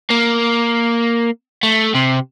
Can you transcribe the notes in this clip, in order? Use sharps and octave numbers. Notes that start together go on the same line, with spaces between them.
A#3
A3
C3